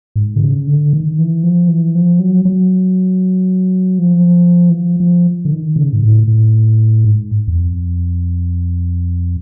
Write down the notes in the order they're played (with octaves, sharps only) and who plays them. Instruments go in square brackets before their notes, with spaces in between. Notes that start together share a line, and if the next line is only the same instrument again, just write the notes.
[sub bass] G#2
D3
C#3
D3
D#3
E3
F3
E3
F3
F#3
F#3
F3
E3
F3
F3
D3
D#3
C#3
G#2
A2
A2
G#2
E2
F2